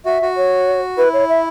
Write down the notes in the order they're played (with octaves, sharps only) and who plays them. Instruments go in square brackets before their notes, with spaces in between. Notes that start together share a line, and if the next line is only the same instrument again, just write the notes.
[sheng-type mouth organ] F#4 [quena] E5
[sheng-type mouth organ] F#4
[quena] C#5
[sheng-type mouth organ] E4 [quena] B4
[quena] C#5
E5